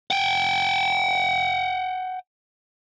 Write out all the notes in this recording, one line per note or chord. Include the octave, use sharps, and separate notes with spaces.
F#5 G5